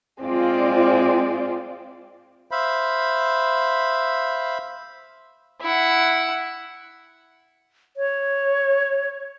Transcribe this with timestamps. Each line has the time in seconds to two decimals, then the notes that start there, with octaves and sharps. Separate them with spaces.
0.22 G#3 C4 F4 D5
2.51 C5 E5 F5 B5
5.62 E4 F#5
7.97 C#5